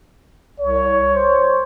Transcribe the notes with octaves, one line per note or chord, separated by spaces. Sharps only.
C2 C#5
C5